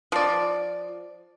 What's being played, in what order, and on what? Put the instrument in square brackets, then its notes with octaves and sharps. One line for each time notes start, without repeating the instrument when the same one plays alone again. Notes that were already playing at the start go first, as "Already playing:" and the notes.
[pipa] F3 D5